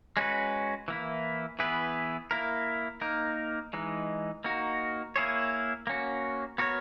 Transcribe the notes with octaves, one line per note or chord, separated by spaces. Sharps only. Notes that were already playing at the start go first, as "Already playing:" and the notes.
G#3 C#4 F#4 B4
E3 A#3 E4
E3 B3 E4 G#4 B4
A#3 E4 A#4
A#3 D#4 A#4
E3 G#3 D#4
A#3 D#4 F#4
A#3 E4 G#4 C#5
A#3 C#4 F#4
B3 F#4 A#4 C#5